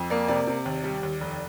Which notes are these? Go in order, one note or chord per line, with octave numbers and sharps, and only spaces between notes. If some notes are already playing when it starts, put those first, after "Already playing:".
Already playing: F2
A#3 D5
C3 D5
C3
D#2
G3
D#2
F1